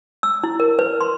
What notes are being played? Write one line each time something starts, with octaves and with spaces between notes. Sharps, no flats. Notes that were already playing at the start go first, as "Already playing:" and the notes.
E6
E4
A#4
B4
C6